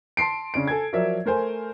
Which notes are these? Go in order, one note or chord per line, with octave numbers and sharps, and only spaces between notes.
A5 C6 C7 D7
C#3 C#4 D4 D7
A4 G#5 G#6
F3 F#3 A#4 D5 E5
A3 A#4 C5 G#5